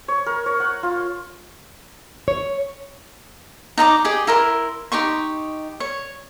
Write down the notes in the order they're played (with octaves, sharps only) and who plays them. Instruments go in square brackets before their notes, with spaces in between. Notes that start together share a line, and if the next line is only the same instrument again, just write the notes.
[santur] C#5
A#4
C#5
F#5
F4
[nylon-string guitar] C#5
[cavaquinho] D#4 D#5 A#5 D6
G4 G#4 D#5
E4 A#4 C6
D#4 G4 C6 C#6
C#5